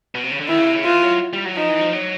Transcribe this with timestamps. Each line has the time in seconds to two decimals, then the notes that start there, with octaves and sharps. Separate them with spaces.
0.15 B2
0.23 C3
0.31 C#3
0.40 D3
0.49 D#3 E4
0.58 C#3
0.67 C3
0.76 C#3
0.84 E3 F4
1.03 F#3
1.33 G3
1.45 F#3
1.57 F3 D#4
1.69 E3
1.81 F3
1.93 F#3